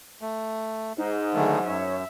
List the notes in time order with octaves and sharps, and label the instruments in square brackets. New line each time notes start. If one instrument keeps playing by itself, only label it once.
[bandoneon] A3
[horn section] G#2 [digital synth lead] D#4
[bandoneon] D3 D#3 A3 [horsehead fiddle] F#3 G#4
[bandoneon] F#2 [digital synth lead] C#5 [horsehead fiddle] E5